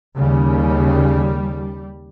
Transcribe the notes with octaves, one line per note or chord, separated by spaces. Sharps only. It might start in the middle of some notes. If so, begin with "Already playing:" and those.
D#2 C#3 G3